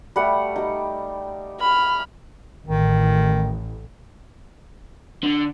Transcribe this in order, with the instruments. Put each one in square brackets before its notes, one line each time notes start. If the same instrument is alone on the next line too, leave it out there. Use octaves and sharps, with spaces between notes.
[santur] G3 A3 F#5
D#4 G4
[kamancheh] B5 F6
[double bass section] A1 [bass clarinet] D#3
[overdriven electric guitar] D3